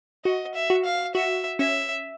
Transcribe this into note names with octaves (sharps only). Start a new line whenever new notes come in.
F#4 D#5
E5
F#4
F5
F#4 E5
C#4 E5